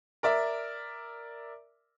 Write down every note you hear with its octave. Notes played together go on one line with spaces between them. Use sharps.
A#4 D5 E5